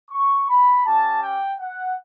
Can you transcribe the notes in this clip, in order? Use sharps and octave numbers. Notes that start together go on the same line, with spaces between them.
C#6
B5
C#4 G4 A5
G5
F#5